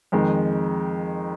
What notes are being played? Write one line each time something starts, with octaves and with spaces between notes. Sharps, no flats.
F2 D#3 G#3